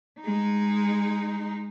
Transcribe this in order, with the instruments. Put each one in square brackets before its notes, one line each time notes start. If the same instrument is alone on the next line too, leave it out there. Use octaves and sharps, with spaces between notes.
[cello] G#3 D#4